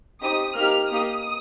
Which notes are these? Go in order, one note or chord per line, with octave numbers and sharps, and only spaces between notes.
C4 D#4 G4 D#6
A#3 D#4 G4 F6
A#3 D#4 G4 D#6